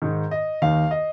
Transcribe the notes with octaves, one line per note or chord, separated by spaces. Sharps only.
G#2 D#3
D#5
D#2 D#3 F5
D#5